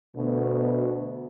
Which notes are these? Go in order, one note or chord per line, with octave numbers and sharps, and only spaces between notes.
D2 B2